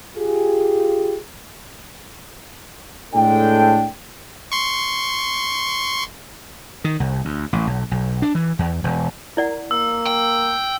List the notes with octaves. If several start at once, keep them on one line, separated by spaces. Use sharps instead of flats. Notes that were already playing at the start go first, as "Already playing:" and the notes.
F4 G4 G#4
A2 G#3 D4 A4 G5
C6 C#6
D#3
C2
D2
A1
B1
B1
D4
E3
E2
E1
E4 A#4 D5 F#5
A#3 E6
G5